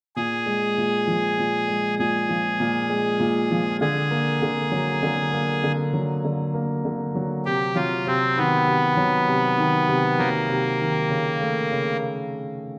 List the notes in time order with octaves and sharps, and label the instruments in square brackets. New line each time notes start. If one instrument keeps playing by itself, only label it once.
[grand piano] A#2 [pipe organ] G#4
[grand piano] G#3
A#2
F3
A#2
G#3
[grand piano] A#2 [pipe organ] G#4
[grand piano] F3
A#2
G#3
A#2
F3
[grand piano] D3 [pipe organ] G#4
[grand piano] A#3
D3
F#3
D3
A#3
D3
F#3
D3
A#3
D3
F#3
[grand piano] C3 [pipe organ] G4
[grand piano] F#3 [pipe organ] F4
[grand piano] C3 [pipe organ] C4
[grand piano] D#3 [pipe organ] B3
[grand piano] C3
F#3
C3
D#3
C3
[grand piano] F#3 [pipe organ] A#3
[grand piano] C3
D#3
C#3
A3
C#3